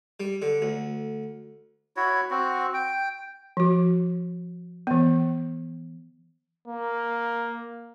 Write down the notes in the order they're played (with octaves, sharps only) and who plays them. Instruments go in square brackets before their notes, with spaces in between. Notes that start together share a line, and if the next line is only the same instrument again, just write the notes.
[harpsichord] G3
D3
D2
[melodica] E4 F#4 C#5
C4 F#4
G5
[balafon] F3 F#4
E3 B3
[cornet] A#3